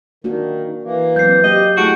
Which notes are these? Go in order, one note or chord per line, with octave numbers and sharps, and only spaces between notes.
D#3 A#3 D4 F#4
E3 A#3
F#3 C4 G6 C7
A#3 C4 G4 D#5
A3 E4 F#4 G#4 A5 C#6 C#7 D7